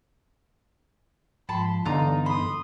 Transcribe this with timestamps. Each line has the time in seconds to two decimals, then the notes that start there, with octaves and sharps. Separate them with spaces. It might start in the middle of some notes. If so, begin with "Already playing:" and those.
1.49 G#2 F3 A5 B5 C6
1.85 G2 D3 E3 B3 D#4 F4 A#5
2.26 B5 C6 D#6